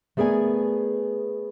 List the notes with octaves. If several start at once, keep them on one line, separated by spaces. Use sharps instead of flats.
A3 B3 G#4 A#4 D5 G#5